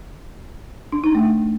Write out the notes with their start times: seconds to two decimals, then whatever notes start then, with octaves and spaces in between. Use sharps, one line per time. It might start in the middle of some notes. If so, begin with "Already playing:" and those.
0.93 D4
1.04 D#4
1.15 A3